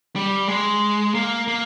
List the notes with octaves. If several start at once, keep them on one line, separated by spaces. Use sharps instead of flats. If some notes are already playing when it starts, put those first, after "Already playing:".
G3
G#3
A#3
A#3